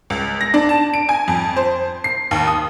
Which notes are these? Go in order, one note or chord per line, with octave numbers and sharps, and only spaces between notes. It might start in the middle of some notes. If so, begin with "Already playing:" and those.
C#2
A#6
D4
A5
D7
G#5
F2
C5
C7
D#2
D#6